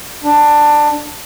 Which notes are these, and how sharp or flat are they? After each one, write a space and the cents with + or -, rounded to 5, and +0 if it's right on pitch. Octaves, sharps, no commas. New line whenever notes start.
D4 +15